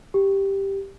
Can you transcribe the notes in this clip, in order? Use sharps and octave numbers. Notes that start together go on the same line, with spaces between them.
G4